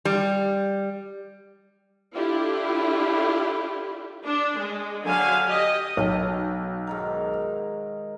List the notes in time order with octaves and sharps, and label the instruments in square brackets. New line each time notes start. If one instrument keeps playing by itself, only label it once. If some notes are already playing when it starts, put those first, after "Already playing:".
[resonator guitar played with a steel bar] G3
[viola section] D4 E4 F4 G4 A4
D4
G#3
D3 F#3 F5 G#5
G4 D#5
[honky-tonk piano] B1 [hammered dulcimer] F5 G5 G#5
[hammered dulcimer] G#2 D#3 A#4